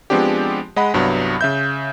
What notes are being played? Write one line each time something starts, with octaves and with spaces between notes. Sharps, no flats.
F3 G#3 B3 C4 D4 G4
G#3 D#5 F#5 B5
C2 G2 F#3 B3
C#3 E5 G6